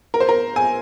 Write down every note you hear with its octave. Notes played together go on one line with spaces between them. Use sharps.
A#4
C5
A#4
G#5